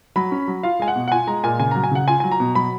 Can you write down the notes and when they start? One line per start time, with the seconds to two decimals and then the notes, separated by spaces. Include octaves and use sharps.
0.16 F#3 B5
0.32 C#4
0.48 F#3
0.63 F4 F5
0.80 G#3 G#5
0.88 F#5
0.96 B2
1.08 F#5
1.11 F4 G#5
1.27 G#3 A#5
1.44 A#2 G#5
1.60 C#3 G#5
1.71 F#3 A#5
1.84 G#5
1.91 C#3 F#5
2.08 F4 G#5
2.20 F#3 G#5
2.32 A#5
2.40 B2
2.55 F#3 B5